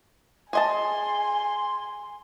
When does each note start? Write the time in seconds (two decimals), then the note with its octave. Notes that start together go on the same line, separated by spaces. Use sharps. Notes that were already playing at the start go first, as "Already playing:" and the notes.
0.53 G#4 D#5 G#5 A5 C6